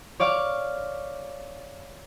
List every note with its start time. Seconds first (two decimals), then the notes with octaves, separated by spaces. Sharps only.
0.20 C#5 D5 F5 C#6 D6